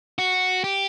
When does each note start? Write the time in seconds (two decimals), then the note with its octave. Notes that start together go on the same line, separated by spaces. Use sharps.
0.18 F#4
0.64 G4